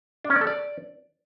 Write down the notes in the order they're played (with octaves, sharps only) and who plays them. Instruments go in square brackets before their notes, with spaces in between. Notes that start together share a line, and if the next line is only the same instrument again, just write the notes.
[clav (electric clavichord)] D4
C#4
D5
A4
D5